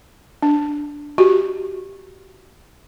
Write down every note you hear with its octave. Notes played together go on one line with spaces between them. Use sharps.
D4
F#4 G4